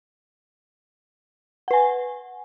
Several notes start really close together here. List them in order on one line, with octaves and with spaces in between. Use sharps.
F#5 B4 G#5